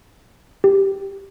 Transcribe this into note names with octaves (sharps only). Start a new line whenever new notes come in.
G4